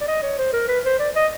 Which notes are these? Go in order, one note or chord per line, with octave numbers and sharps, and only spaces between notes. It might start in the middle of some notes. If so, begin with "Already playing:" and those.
D5
D#5
C#5
C5
A#4
B4
C5
D5
D#5